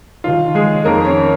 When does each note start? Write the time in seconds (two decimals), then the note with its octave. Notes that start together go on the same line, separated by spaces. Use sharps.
0.24 D#2 D#3 F4
0.55 G#3 G#4
0.85 F2 D#3 A#3 A#4
1.05 C#4 C#5